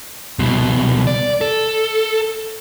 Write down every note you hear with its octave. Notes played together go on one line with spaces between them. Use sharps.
C2 B2
D5
A4